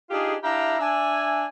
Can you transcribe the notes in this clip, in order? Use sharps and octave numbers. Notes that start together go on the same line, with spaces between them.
D4 D#4 F4 G4 G#4
D4 E4 G4 E5 F5 A#5
D4 E5 G#5